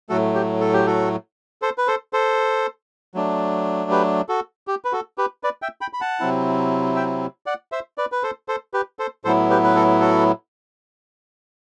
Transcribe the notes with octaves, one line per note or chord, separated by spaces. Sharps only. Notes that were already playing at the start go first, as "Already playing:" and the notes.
A2 F#3 A3 F#4 A4
G4
A4
G4
F#4 A4
A4 C5
B4
A4 C5
A4 C5
F#3 A3 D4
G4 B4
F#4 A4
G4
B4
F#4 A4
G4 B4
B4 D5
E5 G5
G5 B5
B5
F#5 A5
C3 F#3 C4 E4
E5 G5
D5 F#5
C5 E5
B4 D5
B4
A4 C5
A4 C5
G4 B4
A4 C5
A2 F#3 B3 E4 A4 C5
G4 B4
B4
F#4 A4
F#4 A4